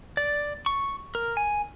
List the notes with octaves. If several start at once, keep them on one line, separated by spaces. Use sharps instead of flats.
D5
C#6
A#4
G#5